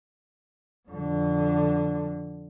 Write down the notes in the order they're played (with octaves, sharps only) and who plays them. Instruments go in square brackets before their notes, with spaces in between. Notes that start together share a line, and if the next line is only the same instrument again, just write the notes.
[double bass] F2 D3